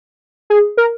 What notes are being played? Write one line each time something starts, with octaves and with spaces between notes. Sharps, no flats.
G#4
A#4